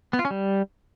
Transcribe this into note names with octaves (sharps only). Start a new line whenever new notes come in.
B3
F4
C#4
G3